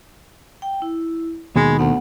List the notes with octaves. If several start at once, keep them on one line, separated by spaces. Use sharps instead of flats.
G5
E4
D#2 B2 D#3 G#3 B5
D2 B3 F#5